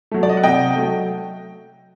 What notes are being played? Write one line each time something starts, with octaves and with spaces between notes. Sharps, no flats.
F#3 A3
D5
D#5
F#5
C3 D#5 G5
F#3 A3